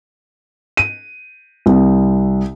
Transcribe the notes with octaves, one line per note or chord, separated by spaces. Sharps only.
D#7
C2